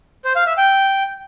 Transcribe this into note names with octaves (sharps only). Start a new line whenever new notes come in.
C5
F5
E5
G5